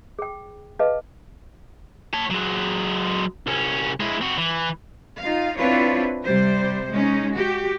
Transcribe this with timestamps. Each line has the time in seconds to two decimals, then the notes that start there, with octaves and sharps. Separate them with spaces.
0.19 G#4 G5
0.79 G#4 B4 D#5 F5 A5
2.13 C#5 A5
2.30 F#3 G#3
3.47 C2 C#4
4.00 G#3 E4
4.21 C4 F#4
4.38 E3
5.20 D#4 F4 F5
5.58 C4 D4 E4 F4 B4 C#5
6.23 C3 G3 C5
6.92 G#3 C#4 D#4
7.33 F#4 G4